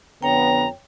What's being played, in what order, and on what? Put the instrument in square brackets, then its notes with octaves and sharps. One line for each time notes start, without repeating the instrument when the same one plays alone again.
[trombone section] F2 D3 B3 [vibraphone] C#5 G5 [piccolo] A#5